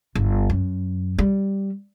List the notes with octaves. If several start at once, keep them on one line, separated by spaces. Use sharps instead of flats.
G1
F#2
G3